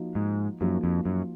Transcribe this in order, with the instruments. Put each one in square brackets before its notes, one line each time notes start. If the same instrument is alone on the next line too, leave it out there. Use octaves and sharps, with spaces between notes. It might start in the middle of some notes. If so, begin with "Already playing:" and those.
Already playing: [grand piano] F3 A#3 D#4 F#4
[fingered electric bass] G#2
[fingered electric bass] F#2 [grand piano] F3 A#3 D#4 F#4
[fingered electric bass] F2
F#2